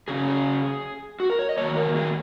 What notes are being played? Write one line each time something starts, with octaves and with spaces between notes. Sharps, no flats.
C#3 F#3 C#4 G#4
G#4
F#4
A#4
C#5
D#5
D#3 F#3 A#3 C#5
A#4
G#4